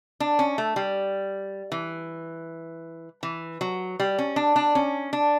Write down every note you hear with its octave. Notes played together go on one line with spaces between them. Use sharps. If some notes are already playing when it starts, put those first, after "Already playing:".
D4
C#4
A3
G3
E3
E3
F#3
G3
C#4
D4
D4
C#4
D4